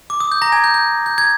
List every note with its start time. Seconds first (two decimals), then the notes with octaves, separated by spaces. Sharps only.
0.10 D6
0.20 D#6
0.32 G6
0.42 A#5 A#6
0.52 G#5 G#6
0.64 G6
0.74 G6
1.06 G6
1.18 G#6